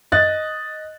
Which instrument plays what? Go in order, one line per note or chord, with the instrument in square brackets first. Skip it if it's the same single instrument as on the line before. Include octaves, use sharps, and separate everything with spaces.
[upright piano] D#5 F#6 A6